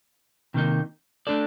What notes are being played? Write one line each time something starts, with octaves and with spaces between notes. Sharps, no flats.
C3 D#3 A#3 D#4
A3 D4 A4 D5